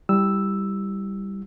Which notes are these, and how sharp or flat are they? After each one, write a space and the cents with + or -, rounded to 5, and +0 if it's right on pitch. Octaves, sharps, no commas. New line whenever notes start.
G3 +0 E4 +0 E6 +0